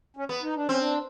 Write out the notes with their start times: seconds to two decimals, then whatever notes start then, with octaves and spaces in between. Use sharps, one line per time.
0.17 C#4
0.29 B3
0.42 D#4
0.55 D4
0.67 C4 C#4
0.78 D4